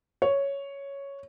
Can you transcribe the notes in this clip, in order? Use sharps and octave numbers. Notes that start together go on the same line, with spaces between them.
C#5